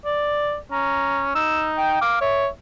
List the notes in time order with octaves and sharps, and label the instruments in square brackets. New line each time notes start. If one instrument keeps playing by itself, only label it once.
[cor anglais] D5
[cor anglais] C#4 [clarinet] A#5
[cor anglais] D#4 [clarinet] E6
[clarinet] G5
[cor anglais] F5 [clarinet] D6
[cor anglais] C#5 [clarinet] E5